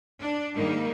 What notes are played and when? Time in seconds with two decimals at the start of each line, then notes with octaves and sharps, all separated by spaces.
0.20 D4
0.54 G#2 D#3 G3 G#3 A#3 D#4